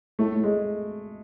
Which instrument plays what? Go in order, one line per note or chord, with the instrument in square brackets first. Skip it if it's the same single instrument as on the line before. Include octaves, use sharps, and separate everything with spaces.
[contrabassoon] A2 [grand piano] A3
[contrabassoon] A2
[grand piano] G#3